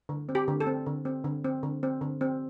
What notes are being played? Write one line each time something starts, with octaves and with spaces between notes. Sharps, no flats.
D3
C4
G4
D3
A4
C4
D3
C4
D3
C4
D3
C4
D3
C4